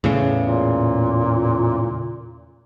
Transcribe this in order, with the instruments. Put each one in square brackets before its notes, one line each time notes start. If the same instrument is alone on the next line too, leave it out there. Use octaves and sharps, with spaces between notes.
[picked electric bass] E2 A2 C#3
[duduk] A#2